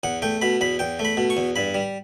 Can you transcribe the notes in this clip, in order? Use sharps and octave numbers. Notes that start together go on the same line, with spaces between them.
E2 F#5
A3 G5
B2 B5
E2 B5
E2 G5
A3
B5
B2
C#6
E2
G2 B5
G3